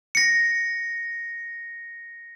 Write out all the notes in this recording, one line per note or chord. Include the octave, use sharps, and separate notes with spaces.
A#6 C#7